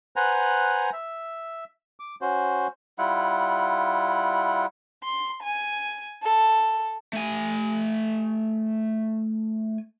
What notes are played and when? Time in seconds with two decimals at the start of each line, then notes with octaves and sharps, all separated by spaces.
0.16 B4 C5 F#5 G#5 A#5
0.93 E5
2.00 D6
2.21 C#4 F#4 C5
2.98 G3 E4 F4 F#5
5.03 C6
5.42 G#5
6.23 A4
7.13 A3 G#5